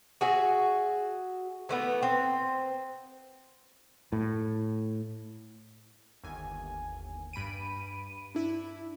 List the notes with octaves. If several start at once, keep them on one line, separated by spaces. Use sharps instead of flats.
F#4 G#4 E5
E3 A3 B3
C4
A2
G1 D#2 G#5
G2 B5 D7 D#7
D4 E4